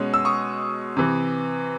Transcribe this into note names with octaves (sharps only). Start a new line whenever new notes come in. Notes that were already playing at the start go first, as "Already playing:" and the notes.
Already playing: B2 G#3 C#4
E6
C#6 D#6
C3 E3